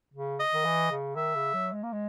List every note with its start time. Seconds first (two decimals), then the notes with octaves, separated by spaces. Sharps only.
0.14 C#3
0.40 D#5
0.54 D#3
0.65 E3
0.91 C#3
1.16 D#3 E5
1.35 C#3
1.54 F#3
1.73 G#3
1.83 A#3
1.92 G#3